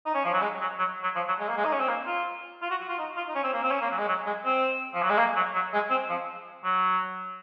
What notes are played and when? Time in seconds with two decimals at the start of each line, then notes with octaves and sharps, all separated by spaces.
0.06 D#4
0.15 C#4
0.25 F3
0.33 F#3
0.42 G#3
0.61 F#3
0.79 F#3
1.03 F#3
1.16 F3
1.28 F#3
1.40 G#3
1.48 A#3
1.57 G#3
1.65 D#4
1.73 C#4
1.80 C4
1.88 A#3
2.06 F4
2.62 F4
2.70 F#4
2.81 F#4
2.89 F4
2.99 D#4
3.17 F4
3.29 D#4
3.35 C#4
3.44 C4
3.53 A#3
3.63 C4
3.71 C#4
3.81 A#3
3.91 F#3
3.99 G#3
4.08 F#3
4.26 G#3
4.45 C4
4.94 F3
5.02 F#3
5.10 G#3
5.18 A#3
5.36 F#3
5.54 F#3
5.73 G#3
5.91 C4
6.10 F3
6.64 F#3